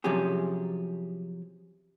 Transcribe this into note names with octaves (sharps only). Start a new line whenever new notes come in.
C3 F3 F#3 C#4 G4 G#4